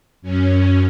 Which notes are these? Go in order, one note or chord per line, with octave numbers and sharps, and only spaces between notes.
F#2 C#4